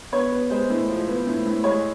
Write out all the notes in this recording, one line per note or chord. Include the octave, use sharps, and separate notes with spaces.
B3 C#5
B3
G#3 C5
A2
F3
B3
A2
A2
G#3 C#5